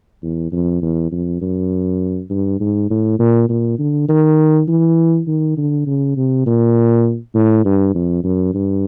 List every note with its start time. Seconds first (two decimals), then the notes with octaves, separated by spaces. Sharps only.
0.23 E2
0.52 F2
0.82 E2
1.12 F2
1.41 F#2
2.30 G2
2.60 G#2
2.90 A2
3.19 A#2
3.49 A#2
3.79 D3
4.08 D#3
4.68 E3
5.27 D#3
5.57 D3
5.87 C#3
6.16 C3
6.46 A#2
7.35 A2
7.65 G2
7.95 F2
8.24 F#2
8.54 G2